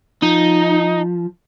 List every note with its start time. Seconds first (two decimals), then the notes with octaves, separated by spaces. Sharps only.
0.23 F3 D#4